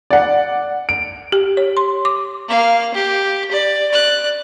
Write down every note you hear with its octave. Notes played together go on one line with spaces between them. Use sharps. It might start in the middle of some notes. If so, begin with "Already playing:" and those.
D5 F#5
D7
G4
C#5
C6
D6
A#3 F5
G4
D5
D5 F#6